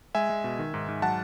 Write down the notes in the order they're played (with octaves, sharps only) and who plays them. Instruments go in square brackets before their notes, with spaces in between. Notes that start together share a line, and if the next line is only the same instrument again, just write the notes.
[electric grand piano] G#3 E5 G#5
G#3
B2
D#3
G#2
G#2
F#3 F#5 A5